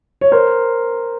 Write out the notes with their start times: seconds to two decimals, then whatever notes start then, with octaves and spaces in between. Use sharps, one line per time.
0.21 C#5
0.32 A#4 C5